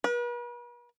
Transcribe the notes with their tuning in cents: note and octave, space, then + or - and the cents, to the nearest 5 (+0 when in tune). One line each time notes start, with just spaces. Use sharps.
B4 -45